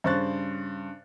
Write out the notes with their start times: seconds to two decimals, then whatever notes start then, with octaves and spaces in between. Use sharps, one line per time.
0.04 G2 C#3 C5 C#6 F#6 A6